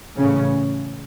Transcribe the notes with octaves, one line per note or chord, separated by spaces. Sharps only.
A1 A2 C#3 C#4